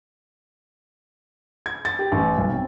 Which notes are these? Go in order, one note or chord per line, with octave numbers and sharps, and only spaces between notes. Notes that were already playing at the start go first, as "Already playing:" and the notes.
G#6
A6
G4
A1
B1
C4